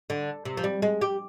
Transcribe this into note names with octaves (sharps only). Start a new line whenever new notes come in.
D3
C3
F3
G3
G#3
G4